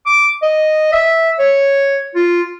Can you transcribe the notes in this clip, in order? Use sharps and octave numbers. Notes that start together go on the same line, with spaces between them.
D6
D#5
E5
C#5
F4